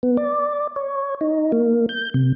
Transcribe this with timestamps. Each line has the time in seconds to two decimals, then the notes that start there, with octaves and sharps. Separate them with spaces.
0.03 B3
0.17 D5
0.76 C#5
1.21 D#4
1.52 A#3
1.89 G6
2.14 C3